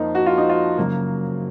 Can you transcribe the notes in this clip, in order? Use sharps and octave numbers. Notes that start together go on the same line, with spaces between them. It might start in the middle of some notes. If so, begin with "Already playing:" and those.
Already playing: F2 F3 A#3 D#4
F#4
F4
D#4
F4
F#2 C#3 F#3 A#3